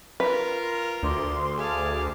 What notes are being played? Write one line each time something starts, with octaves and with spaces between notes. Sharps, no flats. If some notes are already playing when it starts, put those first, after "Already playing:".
F4 A#4 B4
D2 C6 D6
G#4 F5 A5 D6